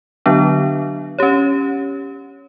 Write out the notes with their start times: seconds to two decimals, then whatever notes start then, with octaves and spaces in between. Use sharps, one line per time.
0.26 D3 F#3 B3 D4
1.19 C#4 G4 C#5